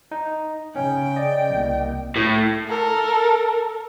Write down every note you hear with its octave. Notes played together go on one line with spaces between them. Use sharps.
D#4
C#3 C#4 G5
D5 D#5
C2 A#3
A2
A4 A#4